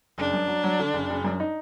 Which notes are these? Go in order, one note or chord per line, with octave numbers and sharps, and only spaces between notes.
F#1 D4
F#2
F#3
F#3
D3
F#1
F#1
F#2
D#4